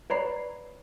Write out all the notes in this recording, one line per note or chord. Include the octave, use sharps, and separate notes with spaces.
B4 C#5 D5 A#5 B5 C7